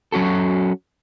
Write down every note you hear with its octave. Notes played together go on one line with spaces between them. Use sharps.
F#3 C#4 F#4 A4